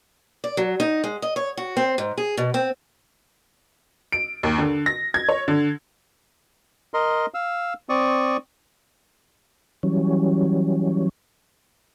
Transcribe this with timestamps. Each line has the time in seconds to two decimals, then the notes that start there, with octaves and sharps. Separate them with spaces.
0.44 D5
0.57 F#3
0.80 D#4
1.04 G#3
1.22 D#5
1.36 C#5
1.57 F#4
1.77 C4
1.98 G#2
2.18 G#4
2.37 B2
2.54 C4
4.12 D7
4.43 D#2
4.58 D3
4.86 A#6
5.14 G#6
5.29 C#5
5.48 D3
6.94 A#4 D#5 C6
7.34 F5 E6
7.89 C4 D5 C#6 D#6
9.83 E3 F#3 G3 C#4